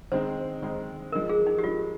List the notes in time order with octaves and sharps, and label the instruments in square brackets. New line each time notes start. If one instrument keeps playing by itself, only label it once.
[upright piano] D#3 G#3 C4 D#4 [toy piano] C5
[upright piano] D#3 G#3 C4 D#4
[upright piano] F3 G#3 D#4 [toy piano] A#4
[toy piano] G#4
D#4
G4
[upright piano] F3 G#3 D#4 [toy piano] F4